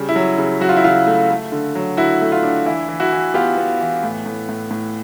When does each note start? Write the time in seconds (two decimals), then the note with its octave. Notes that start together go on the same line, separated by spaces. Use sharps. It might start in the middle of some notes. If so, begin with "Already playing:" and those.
Already playing: C#3 G3
0.09 E4
0.16 F#3
0.38 C#3
0.61 F#3 F#4
0.69 F4
0.77 E4
0.84 C#3 F4
1.07 A3
1.30 A3
1.52 D3
1.75 F#3
1.97 D3 E4 F#4
2.21 A3
2.32 F4
2.43 D4
2.66 E3 E4
2.88 E3
3.00 E4 F#4
3.12 E3
3.34 B3 F4 G4
3.57 B3
3.80 E3
4.03 A2
4.26 A2
4.49 A2
4.71 A2